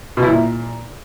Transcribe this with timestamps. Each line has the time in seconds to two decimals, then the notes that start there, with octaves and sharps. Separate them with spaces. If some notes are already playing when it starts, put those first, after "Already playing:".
0.17 B2
0.23 E4
0.28 A#2